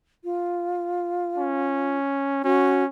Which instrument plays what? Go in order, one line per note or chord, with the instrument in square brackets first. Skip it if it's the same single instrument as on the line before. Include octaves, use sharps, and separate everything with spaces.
[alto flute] F4
[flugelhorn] C#4
[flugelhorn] C#4 [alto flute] F#4